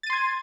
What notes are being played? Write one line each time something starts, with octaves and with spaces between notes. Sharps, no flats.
C6 G#6 A6 D#7